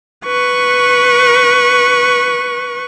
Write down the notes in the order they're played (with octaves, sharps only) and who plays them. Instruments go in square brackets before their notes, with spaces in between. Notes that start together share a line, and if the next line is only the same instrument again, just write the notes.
[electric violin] B4 C#6